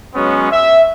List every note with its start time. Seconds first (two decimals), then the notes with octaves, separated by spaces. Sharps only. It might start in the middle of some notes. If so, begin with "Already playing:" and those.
0.15 F#3 G#3 B3 C#4
0.50 E5